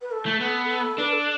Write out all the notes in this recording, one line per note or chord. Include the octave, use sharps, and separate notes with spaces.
B4
A4
A3
B3 A4
A4
D4 B4
A4